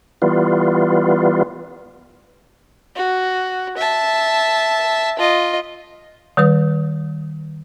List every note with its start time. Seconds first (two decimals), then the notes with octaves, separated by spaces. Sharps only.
0.22 E3 G3 B3 F4
2.95 F#4
3.77 E5 A5
5.19 F4 D#5
6.37 D#3 G3 B4 D#6